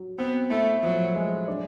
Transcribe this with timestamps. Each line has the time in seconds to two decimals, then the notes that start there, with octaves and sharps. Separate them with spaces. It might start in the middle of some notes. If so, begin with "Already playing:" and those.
Already playing: F#3
0.18 B3 C4
0.50 A3 E4
0.83 F3 F#3
1.15 G#3
1.48 D4